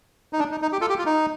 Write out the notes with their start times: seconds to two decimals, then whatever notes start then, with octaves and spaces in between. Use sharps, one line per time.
0.33 D#4
0.39 D4
0.51 D#4
0.62 D#4
0.72 G4
0.81 F4 A4
0.89 G4
0.99 F4
1.06 D#4